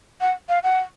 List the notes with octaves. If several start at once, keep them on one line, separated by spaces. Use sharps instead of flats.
F#5
F5
F#5